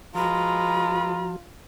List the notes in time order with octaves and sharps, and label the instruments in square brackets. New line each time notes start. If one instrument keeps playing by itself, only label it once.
[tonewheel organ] F3 F#4 [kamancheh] G#3 B4 [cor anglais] F4 [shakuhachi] A#5